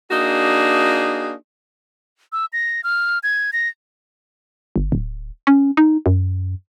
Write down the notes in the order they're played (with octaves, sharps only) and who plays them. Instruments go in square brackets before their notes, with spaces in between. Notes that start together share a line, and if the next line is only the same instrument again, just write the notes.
[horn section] A#3 D4 D#4 F#4 G#4
[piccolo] E6
A#6
F6
G#6
A#6
[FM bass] G1
D1
C#4
D#4
F#2